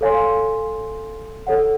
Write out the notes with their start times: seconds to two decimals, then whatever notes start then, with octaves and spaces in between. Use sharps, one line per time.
0.01 A4 C#5 F5 G#5 C6
1.47 A4 C#5 F#5